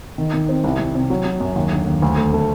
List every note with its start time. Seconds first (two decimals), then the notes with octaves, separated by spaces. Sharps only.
0.18 D#3
0.33 D#3
0.49 C4
0.64 C2
0.79 C2
0.95 C3
1.10 F#3
1.25 F#3
1.40 F#2
1.56 D#2
1.72 D3
1.87 D#2
2.02 D2
2.17 A3
2.33 A3